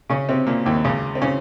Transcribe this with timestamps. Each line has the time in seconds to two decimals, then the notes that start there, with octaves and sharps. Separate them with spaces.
0.09 C#3 C#4
0.28 C3 C4
0.47 A#2 A#3
0.66 D#2 D#3
0.85 C#2 C#3
1.15 C4
1.22 C#3 C#4